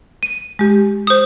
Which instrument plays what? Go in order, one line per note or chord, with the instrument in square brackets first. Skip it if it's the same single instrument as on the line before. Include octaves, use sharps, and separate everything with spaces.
[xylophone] D#7
[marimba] G#3 G4
[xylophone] C5 D#6